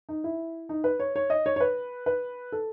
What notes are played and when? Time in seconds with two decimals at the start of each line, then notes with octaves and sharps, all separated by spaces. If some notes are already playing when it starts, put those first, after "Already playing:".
0.09 D#4
0.24 E4
0.69 D#4
0.84 B4
0.99 C#5
1.16 C#5
1.30 D#5
1.46 C#5
1.56 C#5
1.60 B4
2.06 B4
2.52 A4